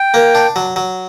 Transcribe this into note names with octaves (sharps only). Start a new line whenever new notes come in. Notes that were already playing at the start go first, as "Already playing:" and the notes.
Already playing: G5
A#3
D4
F#3
F#3